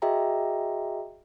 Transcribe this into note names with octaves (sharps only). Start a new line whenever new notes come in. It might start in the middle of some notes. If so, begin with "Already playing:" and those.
F#4 G#4 D#5 E5 G5 A#5